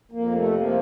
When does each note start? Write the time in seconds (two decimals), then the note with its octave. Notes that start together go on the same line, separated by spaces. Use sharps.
0.12 F2 A#3
0.32 C3 A3
0.54 F3 A#3